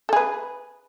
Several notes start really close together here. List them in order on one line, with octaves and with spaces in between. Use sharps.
A4 G#4 B4